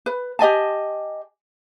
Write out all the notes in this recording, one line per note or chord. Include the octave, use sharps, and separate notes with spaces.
B4
G4 D#5 G#5 A5